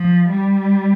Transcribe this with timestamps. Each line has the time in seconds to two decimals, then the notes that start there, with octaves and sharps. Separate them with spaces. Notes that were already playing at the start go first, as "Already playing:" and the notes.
Already playing: F3
0.29 G3